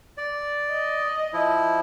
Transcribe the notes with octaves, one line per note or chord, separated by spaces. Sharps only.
D5
D#5
F3 E4